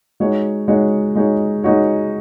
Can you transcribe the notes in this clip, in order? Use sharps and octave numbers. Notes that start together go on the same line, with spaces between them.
G#3 D#4 F#4 C#5
G#3 D#4 F#4 C#5
G#3 D#4 F#4 C#5
G#3 D#4 F#4 C#5